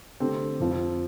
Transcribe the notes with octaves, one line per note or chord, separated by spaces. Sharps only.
D3 A3 C4 G4
F2 F3 C4